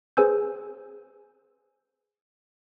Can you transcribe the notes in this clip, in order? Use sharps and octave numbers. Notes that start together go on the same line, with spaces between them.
G#4 B4 C5 G#5 E6 G6